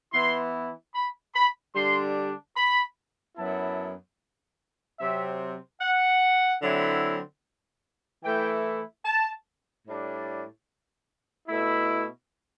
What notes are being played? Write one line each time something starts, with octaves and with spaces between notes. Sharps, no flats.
E3 B3 E4 C6
B5
B5
D3 G3 D4 C6
B5
F#2 F#3 B3 E4 A5
C3 F#3 C4 E5
F#5
D3 F#3 C4 E4
E3 A3 E4 G5
A5
A2 G3 D4
B2 A3 E4